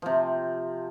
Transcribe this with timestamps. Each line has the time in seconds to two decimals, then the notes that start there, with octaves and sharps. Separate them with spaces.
0.02 C3 F3